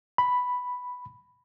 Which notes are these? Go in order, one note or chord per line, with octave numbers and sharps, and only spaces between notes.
B5